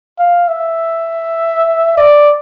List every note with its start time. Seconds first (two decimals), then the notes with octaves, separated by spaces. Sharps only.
0.19 F5
0.48 E5
1.97 D5